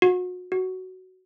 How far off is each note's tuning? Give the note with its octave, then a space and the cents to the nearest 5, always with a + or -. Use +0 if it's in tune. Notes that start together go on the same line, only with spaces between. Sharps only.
F#4 -35
F#4 +10